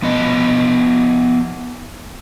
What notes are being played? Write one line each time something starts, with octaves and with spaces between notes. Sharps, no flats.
F3 B3 D#5